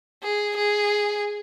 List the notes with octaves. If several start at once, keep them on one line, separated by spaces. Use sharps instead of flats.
G#4
G#4